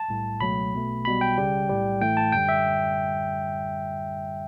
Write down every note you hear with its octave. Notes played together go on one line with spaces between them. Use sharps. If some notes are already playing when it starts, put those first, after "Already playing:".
Already playing: A5
B1 A2 G3
C#2 B2 F#3 A3 B5
B1 B2 A3
B1 B2 G3 B5
G5
C#2 C#3 G3
B1 A2 G3
A1 A2 E3 A3 G5
A5
F#2 D3 G3 G5
E5